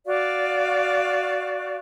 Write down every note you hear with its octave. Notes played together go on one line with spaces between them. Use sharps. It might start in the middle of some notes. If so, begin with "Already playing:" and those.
F#4 D5 F5